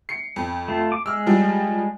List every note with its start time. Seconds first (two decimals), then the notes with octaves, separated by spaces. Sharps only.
0.09 C7 C#7
0.36 F2
0.68 A3 F4
0.92 D6
1.06 G#3 E6 F6
1.27 F3 G3